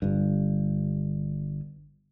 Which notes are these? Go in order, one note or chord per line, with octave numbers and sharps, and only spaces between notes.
G1 G2